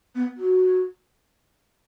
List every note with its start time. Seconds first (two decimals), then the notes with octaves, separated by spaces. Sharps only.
0.14 B3
0.36 F#4